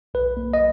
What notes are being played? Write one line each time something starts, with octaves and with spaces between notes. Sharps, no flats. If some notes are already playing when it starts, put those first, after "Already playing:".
B1 B4
A#3
D#5